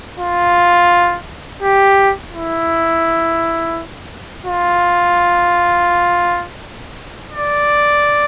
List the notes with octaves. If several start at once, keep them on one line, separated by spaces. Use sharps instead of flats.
F4
G4
E4
F4
D5